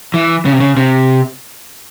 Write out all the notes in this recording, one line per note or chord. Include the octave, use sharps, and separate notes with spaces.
E3
C#3
C3
C#3
C3